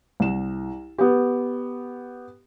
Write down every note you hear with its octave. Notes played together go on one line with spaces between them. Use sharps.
C2 E7
B3 G4